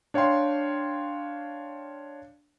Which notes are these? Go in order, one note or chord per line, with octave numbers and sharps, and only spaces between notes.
D4 C#5 F5 G5 C6